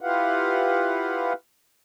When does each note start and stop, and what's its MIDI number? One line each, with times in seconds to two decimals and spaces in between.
0.01 1.33 64
0.01 1.33 65
0.01 1.33 67
0.01 1.33 71
0.01 1.33 77
0.01 1.33 78